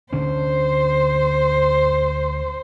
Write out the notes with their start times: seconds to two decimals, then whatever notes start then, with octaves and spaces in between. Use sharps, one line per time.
0.13 D2 D3 C#4 C5